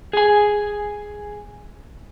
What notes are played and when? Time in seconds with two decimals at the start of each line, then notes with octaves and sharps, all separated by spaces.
0.13 G#4 G#5